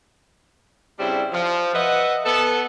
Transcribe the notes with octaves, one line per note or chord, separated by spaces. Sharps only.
C#3 G3 C4 D4 E4
F3
B4 D#5 E5 F#5
B3 A4